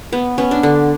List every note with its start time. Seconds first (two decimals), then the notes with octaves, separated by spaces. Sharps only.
0.12 B3
0.38 B3 C#4
0.51 D4
0.63 D3